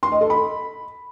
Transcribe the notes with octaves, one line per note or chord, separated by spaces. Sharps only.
C6
D#5
A4
B5